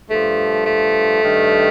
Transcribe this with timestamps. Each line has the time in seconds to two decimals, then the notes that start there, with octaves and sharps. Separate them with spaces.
0.10 G2 F3 A3
0.66 A3
1.21 G2 D#3